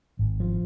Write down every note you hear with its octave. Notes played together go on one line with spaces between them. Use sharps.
G#1
F3